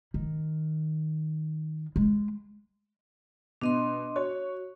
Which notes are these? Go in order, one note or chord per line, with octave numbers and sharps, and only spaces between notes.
D#3
G#3
B2 D4 D#5 C6
F#4 C#5